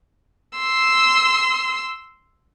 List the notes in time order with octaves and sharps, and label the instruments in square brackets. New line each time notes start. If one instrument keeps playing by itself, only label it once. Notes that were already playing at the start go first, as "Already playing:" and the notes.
[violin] C6 E6